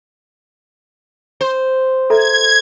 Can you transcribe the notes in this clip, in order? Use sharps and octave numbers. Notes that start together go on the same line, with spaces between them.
C5
A4 E5 A#5 G#6